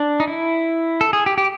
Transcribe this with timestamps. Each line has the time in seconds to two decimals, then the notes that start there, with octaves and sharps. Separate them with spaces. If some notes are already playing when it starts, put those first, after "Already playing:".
Already playing: D4
0.20 D#4
0.27 E4
1.01 A4
1.13 G#4
1.26 G4
1.38 G4